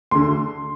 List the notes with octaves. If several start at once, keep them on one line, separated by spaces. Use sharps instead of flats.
D2 D3 C6